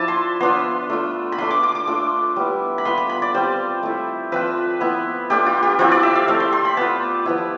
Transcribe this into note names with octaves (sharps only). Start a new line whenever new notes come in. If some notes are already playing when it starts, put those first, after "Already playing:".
Already playing: F3 D4 E4 A5
C6
B3 D4 F4 C6
A3 D4 F4
B5
A3 D4 F4 C6
D6
D6
D6
A3 D4 F4 D6
G3 B3 E4
B5
B3 F4 C6
B5
B5
D5
G3 C4 F4 C5
A3 E4
F3 C4 F4 B4
B3 E4
A3 D4 F4 G4
F4
G4
F3 C4 E4 F4
D5
E5
F5
A3 C4 E4 F5
C6
C6
B5
B3 F4 A5
F3 B3 E4